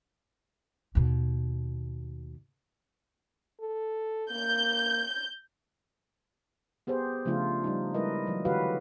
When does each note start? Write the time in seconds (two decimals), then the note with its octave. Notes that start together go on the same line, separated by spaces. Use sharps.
0.95 D#2 B2
3.61 A4
4.31 A#3 G6
6.87 B3 G4 G#4 C5
7.25 C#3 F3 A3 D4 F4
7.64 G3 D#4
7.94 G3 G#3 E4 A#4 B4 D#5
8.26 E3 F#3
8.45 D3 E3 F#4 G4 B4 F5